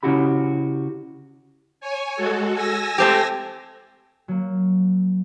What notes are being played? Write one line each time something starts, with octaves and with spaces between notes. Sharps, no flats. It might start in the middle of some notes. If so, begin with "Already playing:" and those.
C#3 C#4 E4 F#4 G4 B5
C#5 G#5
G#3 F#4 A4
G#5 E6 A#6
A3 C4 G4
F#3 A#3